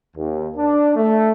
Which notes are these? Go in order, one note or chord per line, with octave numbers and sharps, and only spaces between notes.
D#2
D4
A3